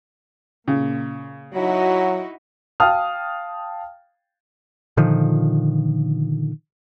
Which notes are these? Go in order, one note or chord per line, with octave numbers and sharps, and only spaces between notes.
A#2 C#3
F#3 D#4 E4 F#4
F5 G5 A5 D#6 F6
A#2 D3 D#3 F3